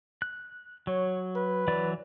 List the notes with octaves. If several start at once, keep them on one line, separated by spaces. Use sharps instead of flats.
F#6
F#3 C#5
B4
E3 F#3 D5